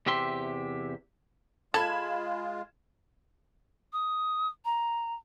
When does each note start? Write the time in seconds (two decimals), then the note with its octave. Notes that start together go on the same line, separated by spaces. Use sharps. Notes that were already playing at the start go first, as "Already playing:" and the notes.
0.06 E2 C3 G4 E5 C6
1.74 G#3 F4 A4 B5 G#6 E7
3.93 D#6
4.65 A#5